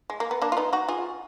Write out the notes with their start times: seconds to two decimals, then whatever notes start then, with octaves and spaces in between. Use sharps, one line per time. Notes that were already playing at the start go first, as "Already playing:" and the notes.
0.10 G#3
0.20 A#3
0.31 B3
0.42 A#3 D4
0.52 F4
0.57 B3 D#4
0.73 D#4 F#4
0.89 F4 G#4